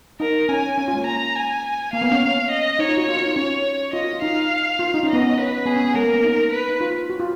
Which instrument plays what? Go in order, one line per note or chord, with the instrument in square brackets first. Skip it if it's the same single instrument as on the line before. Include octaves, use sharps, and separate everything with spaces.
[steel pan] D#4 [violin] A#4
[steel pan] C#4 [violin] G#5
[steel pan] C#4
F4
G#3
A#3
[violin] A#5
G#5
[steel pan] A#3 [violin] F5
[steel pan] B3
C#4
[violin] D#5
[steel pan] D#4 [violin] C#5
[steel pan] F4
F#4
F4
D#4
F4
[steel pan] C#4 [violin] C#5
[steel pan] F4 [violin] D#5
[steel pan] F#4
F4
[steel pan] D#4 [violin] F5
[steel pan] F4
D#4
C#4
[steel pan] B3 [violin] D#5
[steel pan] C#4
[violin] B4
[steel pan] B3 [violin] G#4
[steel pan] C#4
B3
[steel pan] G#3 [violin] A#4
[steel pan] A#3
B3
D#4
[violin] B4
[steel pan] D#4
F4
F#4
F4